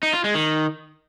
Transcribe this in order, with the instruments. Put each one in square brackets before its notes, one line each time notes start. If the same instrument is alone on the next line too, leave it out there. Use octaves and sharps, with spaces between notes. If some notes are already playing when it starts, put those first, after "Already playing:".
[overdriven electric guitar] D#4
F4
G#3
D#3